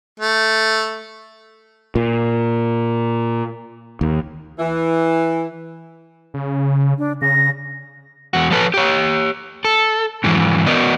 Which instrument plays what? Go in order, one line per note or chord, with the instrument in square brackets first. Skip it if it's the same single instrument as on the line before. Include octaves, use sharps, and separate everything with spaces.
[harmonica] A3
[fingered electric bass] A#2
D#2
[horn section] E3
[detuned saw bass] C#3
[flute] D4
[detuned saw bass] C#3 [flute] A#6
[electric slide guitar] E2 F#4
F3 F#3 A4 B4 C#5
G4 C#5
A4
F2 G#2 E3 F#3
B3 F#4 A#4 D5 D#5